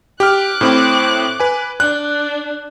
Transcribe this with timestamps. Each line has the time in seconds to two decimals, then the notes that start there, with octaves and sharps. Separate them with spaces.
0.20 G4 D6 F6 F#6
0.61 A2 C4 E4
1.40 B4 G#5
1.80 D4 F#6